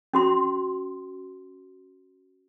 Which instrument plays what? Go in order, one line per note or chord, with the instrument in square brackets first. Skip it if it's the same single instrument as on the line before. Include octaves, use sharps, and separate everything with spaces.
[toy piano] C#4 F#4 C6